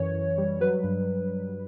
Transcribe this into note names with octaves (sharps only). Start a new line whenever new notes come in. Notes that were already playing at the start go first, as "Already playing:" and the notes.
Already playing: F#2 E3 C#5
F#2
G3
F#3 B4
G2